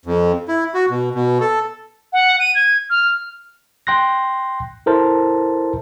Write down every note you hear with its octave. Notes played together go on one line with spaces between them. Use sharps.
F2
E4
F#4
B2
B2
A4
F#5
D#7
G#6
F6
G5 C6 F#6 A#6
E4 A4 A#4 C5 A5